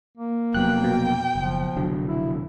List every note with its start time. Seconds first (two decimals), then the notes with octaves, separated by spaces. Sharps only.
0.18 A#3
0.54 F1 F#3 B3 G5 F#6
0.84 B2
1.35 F#1 F3
1.76 F1 D3 F#3
2.09 E4